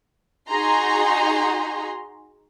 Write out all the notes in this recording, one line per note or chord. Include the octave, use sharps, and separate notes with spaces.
D#4 F#4 G#4 A#5 C6